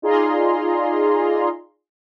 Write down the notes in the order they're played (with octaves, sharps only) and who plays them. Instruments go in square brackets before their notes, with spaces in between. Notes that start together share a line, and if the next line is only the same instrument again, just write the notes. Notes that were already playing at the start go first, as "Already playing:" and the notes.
[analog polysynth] D#4 F4 G#4 D5 A#5 C6